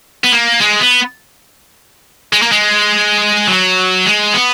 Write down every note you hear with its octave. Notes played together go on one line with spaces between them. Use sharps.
B3
A#3
G#3
B3
G#3
A#3
G#3
F#3
G#3
B3